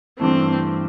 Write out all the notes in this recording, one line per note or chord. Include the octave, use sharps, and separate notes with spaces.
G2 E3 A3 C4